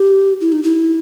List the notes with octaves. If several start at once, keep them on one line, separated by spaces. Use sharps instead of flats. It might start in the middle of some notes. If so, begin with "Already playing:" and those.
Already playing: G4
E4
D#4
E4